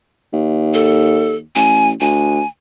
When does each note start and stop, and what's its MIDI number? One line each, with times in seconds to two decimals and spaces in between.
0.33 1.44 39
0.74 1.35 69
1.56 1.93 33
1.56 1.88 80
2.01 2.41 38
2.01 2.47 80